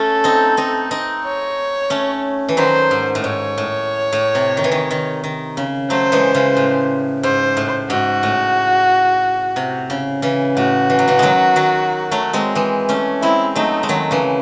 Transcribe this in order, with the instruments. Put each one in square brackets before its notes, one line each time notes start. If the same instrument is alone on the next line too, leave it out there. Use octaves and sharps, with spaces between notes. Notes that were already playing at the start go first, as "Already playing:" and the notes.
Already playing: [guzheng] A3 C#4 [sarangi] A4
[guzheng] C4 D#4
C4 D#4
C4 D#4
[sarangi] C#5
[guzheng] A3 C#4
E3
[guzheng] D#3 F#3 [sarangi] C5
[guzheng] G#2
A2
[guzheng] G#2 [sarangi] C#5
[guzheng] A2
A2
C3
D#3
E3
D#3
D#3
D#3
C#3
[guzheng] F#3 A3 [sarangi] C5
[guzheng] E3 G#3
C#3 E3
A2
[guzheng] G#2 [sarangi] C5
[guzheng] A2
[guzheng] G#2 [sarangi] F#4
[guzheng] A2
C3
C#3
C#3 E3
[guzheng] A2 [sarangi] F#4
[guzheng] E3
F#3
C#3 E3
D#3 F#3 G#3
D#3 F#3
F#3 A3
G#3 C4
E3 G#3
A3 C#4
[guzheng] G#3 C4 [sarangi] E4
[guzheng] F#3 A3 [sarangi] D#4
[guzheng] G#3
D#3 F#3
C#3 E3